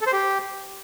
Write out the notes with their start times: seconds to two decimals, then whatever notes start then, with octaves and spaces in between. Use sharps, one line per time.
0.01 A4
0.07 C5
0.13 G4